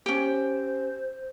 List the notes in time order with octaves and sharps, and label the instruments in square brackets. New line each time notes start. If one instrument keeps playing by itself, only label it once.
[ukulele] C#4 G4 [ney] C5